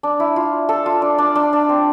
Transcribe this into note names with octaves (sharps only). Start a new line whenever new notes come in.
D4
E4
F4
A4
F4
D4
D4
D4
D4
C4